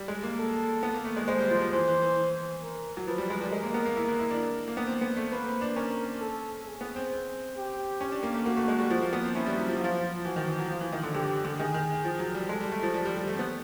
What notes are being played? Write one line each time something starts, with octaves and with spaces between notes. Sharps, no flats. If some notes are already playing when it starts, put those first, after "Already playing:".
Already playing: G3
G#3
A#3
A4
B3
A#3
A3
G#3
G#3 C5
G3
F3
F3
E3 C5
E3
E3
A#4
F#3
F3 B4
G3
G#3
G3
G#3 A#4
A#3
B3
A#3
E4
E4
E4
D4
A#3
B3
C4
B3
A3
A#3 B4
C4
D4
C#4 A#4
A4
G#4
B3
C4
G4
C#4
D4
A#3
A3
A#3 F#4
A3
G#3
G3
F3
A#3
B3
C4
C#4 E4
G3
F#3
F3
F#3
F3 F4
E3 F#4
D#3
E3
F#3
F3 F4
E3
D#3
D3
D3 G4
D3
D#3 G#4
D#3
F3
F#3
G3
G#3 A4
G3
A3
F3
G3
G3
G3
A3
C4
B3